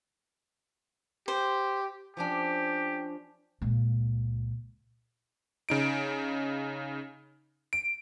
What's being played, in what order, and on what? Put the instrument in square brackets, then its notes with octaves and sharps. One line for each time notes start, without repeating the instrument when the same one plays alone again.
[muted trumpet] G4 [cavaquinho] C5
[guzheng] F3 C#4 D4 [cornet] G4
[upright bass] C#2 A#2
[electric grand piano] C#3 D#4 D7
D7